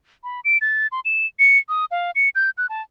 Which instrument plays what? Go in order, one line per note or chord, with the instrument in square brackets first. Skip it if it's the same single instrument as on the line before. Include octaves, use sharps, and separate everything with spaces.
[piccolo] B5
D7
A6
C6
E7
C#7
D#6
F5
C#7
G6
F#6
A5